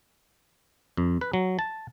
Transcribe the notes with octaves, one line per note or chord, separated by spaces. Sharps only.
F2
B4
F#3
A5